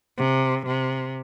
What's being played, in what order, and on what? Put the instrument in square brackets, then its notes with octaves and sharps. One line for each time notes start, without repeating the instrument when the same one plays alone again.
[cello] C3
C3